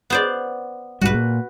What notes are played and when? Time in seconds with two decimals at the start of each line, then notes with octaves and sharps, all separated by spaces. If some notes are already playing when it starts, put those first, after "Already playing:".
0.10 B3 C5 D5
1.01 B1 G#2 G3 F#4 B4
1.14 A#2